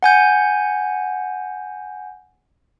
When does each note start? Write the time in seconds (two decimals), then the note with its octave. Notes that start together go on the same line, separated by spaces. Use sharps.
0.03 F#5 G#5 G6